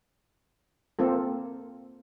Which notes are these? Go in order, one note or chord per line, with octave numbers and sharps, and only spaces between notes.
A#3 C4 F4 A4